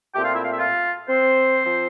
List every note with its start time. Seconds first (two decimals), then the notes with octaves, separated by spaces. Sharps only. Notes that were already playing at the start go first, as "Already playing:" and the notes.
0.14 A#2 A3 C4 G4 G5
0.24 F4 F5
0.33 E4 E5
0.43 F5
0.50 E5
0.59 F4 F5
1.08 C4 C5
1.64 F3 C4